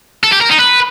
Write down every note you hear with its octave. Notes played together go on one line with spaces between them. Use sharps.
A4
G4
A#4
D#4
B4